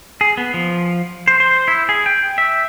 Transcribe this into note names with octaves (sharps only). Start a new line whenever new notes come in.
G#4
B3
F3
C5
C5
E4
G#4
G5
E5